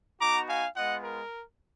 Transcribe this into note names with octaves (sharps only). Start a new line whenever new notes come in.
B3 D#4 F#4 A#5 D6
F5 G#5
G#3 B3 F4 D#5 F#5
A#4